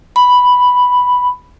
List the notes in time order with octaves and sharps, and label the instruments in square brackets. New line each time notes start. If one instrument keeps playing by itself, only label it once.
[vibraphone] B5